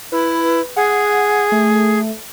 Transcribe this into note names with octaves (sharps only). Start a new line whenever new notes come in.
E4 B4
G#4 F#5
A3